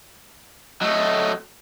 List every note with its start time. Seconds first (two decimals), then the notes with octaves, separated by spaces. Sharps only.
0.82 F#3 A3 D#5